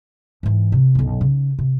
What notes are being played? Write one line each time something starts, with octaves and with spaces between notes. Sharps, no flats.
G#2 E3
C3
B1 F#2
C#3 D#4
C3